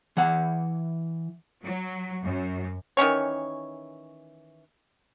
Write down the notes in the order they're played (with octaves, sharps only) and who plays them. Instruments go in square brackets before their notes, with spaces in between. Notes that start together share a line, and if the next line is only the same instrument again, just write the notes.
[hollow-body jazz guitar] E3 F#5
[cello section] F#3
F#2
[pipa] D#3 E3 C#4 C#5